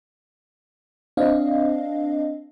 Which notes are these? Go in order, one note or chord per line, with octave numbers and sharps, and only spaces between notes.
C4 D4 D#5 F5